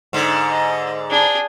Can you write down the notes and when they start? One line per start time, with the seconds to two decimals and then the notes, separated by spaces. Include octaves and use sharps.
0.13 G#2 D3
0.49 D#5
1.10 D4 G#4